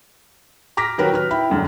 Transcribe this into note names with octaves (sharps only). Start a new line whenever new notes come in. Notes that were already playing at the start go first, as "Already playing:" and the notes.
A#5 D6 F6 A#6 B6
D#3 F#3 F#4 G4 A#4 B4
D#3 B4 F6
E4 G5 B5
E1 F#2 D3